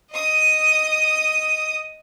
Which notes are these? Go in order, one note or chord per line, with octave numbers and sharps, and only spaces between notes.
D#5 D#6